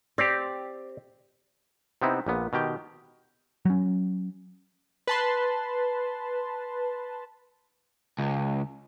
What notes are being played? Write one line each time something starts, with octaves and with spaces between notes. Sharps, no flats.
C4 G4 D5
C3 B3 C4 D#4 E4
A#1 A#2 B3
B2 D#3 G4 G5
F#3 C#4
B4 A5 C6
C#2